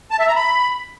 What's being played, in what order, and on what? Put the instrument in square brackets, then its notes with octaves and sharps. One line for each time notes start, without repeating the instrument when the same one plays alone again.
[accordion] A5
E5
A#5
B5